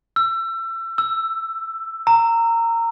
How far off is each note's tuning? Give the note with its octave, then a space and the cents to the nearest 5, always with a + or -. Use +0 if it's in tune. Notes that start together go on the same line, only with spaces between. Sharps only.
E6 +30
E6 +10
A#5 -20